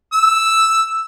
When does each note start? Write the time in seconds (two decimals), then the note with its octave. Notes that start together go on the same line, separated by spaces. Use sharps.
0.13 E6